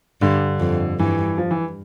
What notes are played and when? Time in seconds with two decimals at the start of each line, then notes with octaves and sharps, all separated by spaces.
0.21 G2 D3
0.60 F2
0.99 G2 E3
1.38 F3
1.51 E3